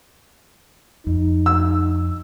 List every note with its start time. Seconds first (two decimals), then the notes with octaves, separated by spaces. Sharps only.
1.07 F2 D#4
1.46 E6